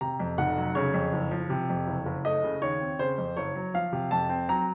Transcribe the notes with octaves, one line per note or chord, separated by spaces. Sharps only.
C3 A#5
F2
F1 F#5
F#3
C#3 C#5
F2
F#1
F3
C3
F2
F#1
F#1
A3 D#5
C#3
D#2 C#5
C4
C#3 C5
F2
F#1 C#5
F#3
F3 F5
C3
F2 A5
C4
F#3 A#5